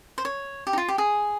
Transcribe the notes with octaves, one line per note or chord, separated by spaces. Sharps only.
C5
C#5
G4
D#4
F4
G4
G#4